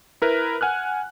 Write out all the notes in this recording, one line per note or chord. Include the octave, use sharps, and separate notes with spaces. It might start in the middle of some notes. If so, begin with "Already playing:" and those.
E4 A#4 B4
F#5 G#5 F6 F#6